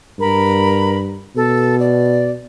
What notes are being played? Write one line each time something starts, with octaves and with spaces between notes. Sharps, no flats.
G2 A#4 B5
B2 A4
D5